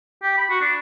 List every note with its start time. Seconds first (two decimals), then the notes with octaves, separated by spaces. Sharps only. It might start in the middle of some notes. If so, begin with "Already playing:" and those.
0.23 G4
0.37 B5
0.50 F#4
0.61 D4